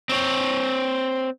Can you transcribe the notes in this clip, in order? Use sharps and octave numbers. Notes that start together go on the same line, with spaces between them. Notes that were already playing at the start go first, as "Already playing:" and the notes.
C4 C#5